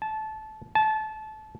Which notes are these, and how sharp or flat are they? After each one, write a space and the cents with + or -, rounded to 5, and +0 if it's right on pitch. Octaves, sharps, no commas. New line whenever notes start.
A5 -20
A5 -25